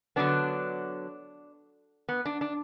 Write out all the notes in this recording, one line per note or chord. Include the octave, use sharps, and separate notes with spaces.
D3 F#3 B3 D4
B3
D4
D4